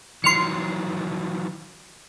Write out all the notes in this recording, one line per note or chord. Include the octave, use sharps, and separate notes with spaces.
D#3 E3 F#3 C6 F6 C#7